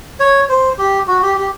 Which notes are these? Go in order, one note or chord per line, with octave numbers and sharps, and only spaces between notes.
C#5
C5
G4
F#4
G4
G4